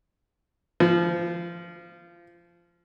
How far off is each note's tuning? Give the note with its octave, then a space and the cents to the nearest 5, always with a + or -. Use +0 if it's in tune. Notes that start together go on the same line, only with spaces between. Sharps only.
F3 -20